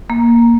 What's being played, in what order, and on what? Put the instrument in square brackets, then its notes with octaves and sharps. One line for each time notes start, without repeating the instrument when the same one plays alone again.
[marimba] A#3